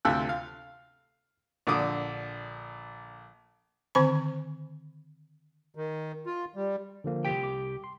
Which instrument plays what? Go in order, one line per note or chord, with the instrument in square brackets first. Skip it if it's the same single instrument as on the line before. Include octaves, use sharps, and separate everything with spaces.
[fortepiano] D2 C3 F4 A4 E6 F#6
F5
A#1 D3 D6 D#6
[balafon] D3 D#3 C4 G#5 B5
[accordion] D#3
F4
G3
[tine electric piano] D3 F3 A#3
[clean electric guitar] C2 G4 G5
[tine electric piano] D6
C6